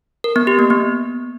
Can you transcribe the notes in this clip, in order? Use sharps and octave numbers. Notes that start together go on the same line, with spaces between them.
A#4
B3
G4
A#3
B3